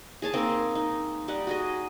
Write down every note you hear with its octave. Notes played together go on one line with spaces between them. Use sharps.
G#4 C#5 A5
A#3 C4 D#4
D#4
G3 D#4 F#5
F#4 G#4 D#5